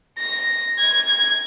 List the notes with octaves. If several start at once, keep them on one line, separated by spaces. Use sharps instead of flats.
A#6
G#6
G#6